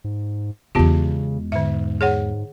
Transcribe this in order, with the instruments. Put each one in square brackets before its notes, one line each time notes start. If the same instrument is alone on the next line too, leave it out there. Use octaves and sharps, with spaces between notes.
[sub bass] G#2
[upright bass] E2 G#3 [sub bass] C#3 [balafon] B3 F4 G4
[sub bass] G#2 [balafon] D3 E5
[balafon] G#4 C#5 F#5